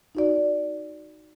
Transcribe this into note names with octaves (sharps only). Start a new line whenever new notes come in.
D#4 F#4 D5